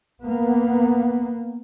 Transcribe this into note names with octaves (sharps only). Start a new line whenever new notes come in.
A#3 B3